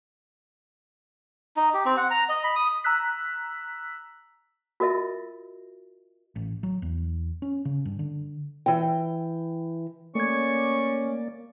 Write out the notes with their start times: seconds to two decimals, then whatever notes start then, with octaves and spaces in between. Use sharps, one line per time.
1.57 D#4
1.74 G4
1.85 C4
1.97 F#5
2.11 A#5
2.29 D#5
2.44 B5
2.56 D#6
2.84 A#5 E6 F#6 B6
4.80 F4 F#4 A#4 D#5 E5
6.36 A1
6.63 F#3
6.82 E2
7.42 C#4
7.65 C#3
7.85 G2
7.99 D3
8.66 E3 G5
10.15 A3 A#3 C#4 D5 C#6 G#6